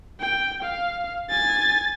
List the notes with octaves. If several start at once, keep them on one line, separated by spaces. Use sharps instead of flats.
G5
F5
G#5 A6